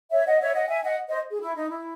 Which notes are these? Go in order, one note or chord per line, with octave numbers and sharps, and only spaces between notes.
C#5 E5
D#5 F#5
C#5 E5
D#5 F#5
E5 G#5
D#5 F#5
C5 D#5
G#4
E4
D#4
E4